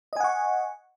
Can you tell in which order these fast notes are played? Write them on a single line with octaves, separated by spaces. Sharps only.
D#5 G#5 F#5 C#6